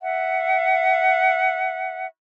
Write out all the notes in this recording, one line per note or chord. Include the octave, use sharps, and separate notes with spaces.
E5 F#5